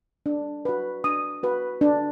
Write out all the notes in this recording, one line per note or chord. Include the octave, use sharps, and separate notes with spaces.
D4
F#4 B4
D4 D#6
F#4 B4
D4